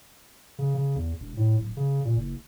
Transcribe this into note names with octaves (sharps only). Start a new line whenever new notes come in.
C#3
C#3
E2
E1
A2
D1
C#3
A#2
F#1